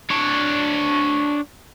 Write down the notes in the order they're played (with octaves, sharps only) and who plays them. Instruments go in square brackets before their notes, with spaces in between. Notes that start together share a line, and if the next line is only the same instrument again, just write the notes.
[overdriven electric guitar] D4 C#5